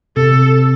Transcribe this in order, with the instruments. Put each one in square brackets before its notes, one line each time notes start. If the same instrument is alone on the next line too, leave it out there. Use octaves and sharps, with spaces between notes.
[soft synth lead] C3 [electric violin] A4